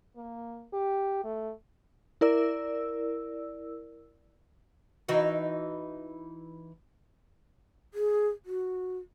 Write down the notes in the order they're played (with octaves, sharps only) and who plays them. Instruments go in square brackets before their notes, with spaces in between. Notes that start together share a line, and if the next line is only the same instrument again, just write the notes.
[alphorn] A#3
G4
A3
[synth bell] E4 A#4 D5 E6
[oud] E3 D#4 F#4
[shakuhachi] G#4
F#4